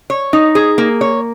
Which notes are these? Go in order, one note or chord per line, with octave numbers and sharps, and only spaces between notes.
C#5
D#4
G#4
A#3
C#5